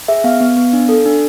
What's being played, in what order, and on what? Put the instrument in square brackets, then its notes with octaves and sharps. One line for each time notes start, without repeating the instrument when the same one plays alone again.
[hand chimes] G#4 E5
B3 F5
B3
B3
D4
A4
D4